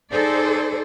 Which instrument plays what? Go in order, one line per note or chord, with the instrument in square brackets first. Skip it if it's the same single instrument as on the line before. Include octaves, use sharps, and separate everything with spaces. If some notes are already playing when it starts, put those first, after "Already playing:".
[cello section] D#4 G#4 A4 C5 D5